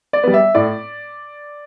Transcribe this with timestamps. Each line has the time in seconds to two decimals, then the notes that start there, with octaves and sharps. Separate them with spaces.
0.13 D5
0.23 G3 B3
0.34 E5
0.55 A2 D5